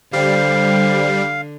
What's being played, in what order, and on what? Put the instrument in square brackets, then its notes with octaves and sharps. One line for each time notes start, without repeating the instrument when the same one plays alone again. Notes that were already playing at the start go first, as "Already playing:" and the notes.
[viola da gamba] D3 [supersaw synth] G3 [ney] C5 [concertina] F5